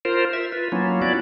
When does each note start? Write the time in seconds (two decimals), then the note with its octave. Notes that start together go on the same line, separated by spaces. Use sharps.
0.05 F4 A#4 C5
0.33 E5
0.52 F4 B4
0.72 F#3 A#3 C#4 E4 F4
1.02 B3 C#4 E4 F#4 D5